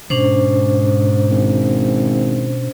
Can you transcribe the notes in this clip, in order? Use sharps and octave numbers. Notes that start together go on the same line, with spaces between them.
G#2 B2 C#4 D4 C5
G#1